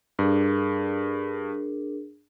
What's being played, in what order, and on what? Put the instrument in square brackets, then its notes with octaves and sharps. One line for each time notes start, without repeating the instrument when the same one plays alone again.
[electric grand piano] G2 [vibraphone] D4 G#4 A#4